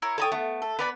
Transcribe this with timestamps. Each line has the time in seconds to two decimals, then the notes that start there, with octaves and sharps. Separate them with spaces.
0.02 E4 A#4 C#5
0.18 A4 C#5 G5 A#5 D#6
0.32 A3 B3
0.62 A4
0.79 B3 B4 D5 B5